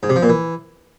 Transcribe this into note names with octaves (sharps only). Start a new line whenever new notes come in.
G#2
C3
F3
A#2
E3